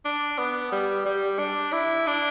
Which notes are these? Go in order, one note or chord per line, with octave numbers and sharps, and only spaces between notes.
D4
B3
G3
G3
D4
E4
D4